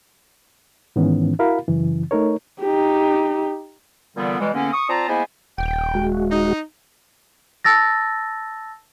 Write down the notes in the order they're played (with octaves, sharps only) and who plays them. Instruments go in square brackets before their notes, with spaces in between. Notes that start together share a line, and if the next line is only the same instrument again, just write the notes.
[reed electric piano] G#2 D#3 E3 B3 C#4
E4 F#4 A#4 F5 B5
F#2 C#3 E3
A3 D#4 A#4 C#5
[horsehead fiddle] D#4 G4
[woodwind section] A#2 D3 E3 G3 B3
B2 E3 G3 G#3
E2 D3 A#3 B3 C#4
C#6 D#6
C4 F4 D5 A5 A#5
G#3 A#3 B3 E4 C5 G#5
[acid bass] D#1 [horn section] G5
[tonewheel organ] G#3 F#4
[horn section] D#4
[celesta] A5 E6 A6 A#6